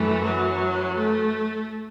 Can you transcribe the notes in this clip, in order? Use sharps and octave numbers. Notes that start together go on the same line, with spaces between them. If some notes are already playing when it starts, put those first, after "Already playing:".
Already playing: F#2 E3 A3
F#3
A3